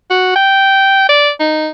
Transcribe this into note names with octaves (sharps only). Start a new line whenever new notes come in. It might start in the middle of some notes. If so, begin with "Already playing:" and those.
F#4
G5
D5
D#4